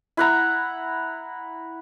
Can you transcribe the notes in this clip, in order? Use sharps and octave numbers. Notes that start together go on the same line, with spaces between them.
E4 F#5 A#5